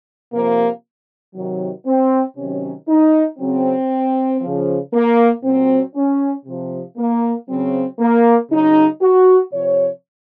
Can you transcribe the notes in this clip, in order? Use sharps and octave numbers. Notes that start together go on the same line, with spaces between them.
C3 F3 A#3
C3 D#3 F#3
C4
C3 D#3 F#3 C#4
D#4
C#3 F#3 C4
C#3 F3
A#3
A#2 F#3 C4
C#4
C3 F3
A#3
C#3 F#3 C4
A#3
C#3 F#3 D#4
F#4
C3 F3 C#5